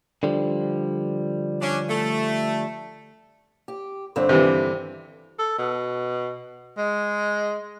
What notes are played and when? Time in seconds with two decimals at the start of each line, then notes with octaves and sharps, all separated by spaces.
0.23 D3 F3 G3
1.61 C#4 D4
1.89 A3
3.68 G4
4.16 G2 D3 C4
4.29 C3 E3
5.39 A4
5.58 B2
6.78 G#3